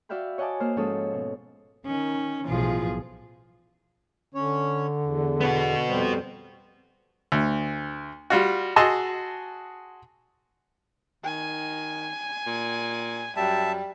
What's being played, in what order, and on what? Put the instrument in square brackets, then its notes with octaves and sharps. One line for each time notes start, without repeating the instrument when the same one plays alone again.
[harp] F#4 D5 E5 F5 G5 B5
C#5 D#5 F#5 G#5 A5 D6
A#3 C5 F6
G#2 F3 C#4 A4 C#5 D#6
B2
[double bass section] D#3 [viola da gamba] C#4
[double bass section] B1 A2 E3 [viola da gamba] F3 F4 G#4
[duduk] D3 [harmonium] C#4 C#5
[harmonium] E2
[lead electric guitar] B3 F#4
[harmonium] F2 G3 C5
[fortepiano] D2
G3 F4 F#4
F#4 G#4 D#5 A5 C6 E6
[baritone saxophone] D#3 [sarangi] G#5
[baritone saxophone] A#2
[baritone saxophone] F#2 [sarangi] G3 [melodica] E5 A5